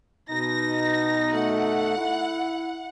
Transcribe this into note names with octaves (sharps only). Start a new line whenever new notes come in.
B2 D#4 A#6
A3 F#5
E4